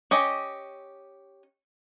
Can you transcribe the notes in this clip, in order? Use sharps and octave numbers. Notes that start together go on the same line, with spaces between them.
C#4 G4 D#5